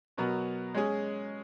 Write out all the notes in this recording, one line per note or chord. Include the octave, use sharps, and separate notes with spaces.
B2 F#3 B3 F#4 A#4
G#3 C#4 G#4